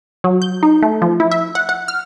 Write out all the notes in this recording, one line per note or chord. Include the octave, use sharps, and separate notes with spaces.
F#3
G6
D#4
A3
F3
E4
E5
F#5
F#5
F6